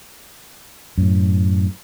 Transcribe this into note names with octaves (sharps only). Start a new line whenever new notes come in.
F#2 A2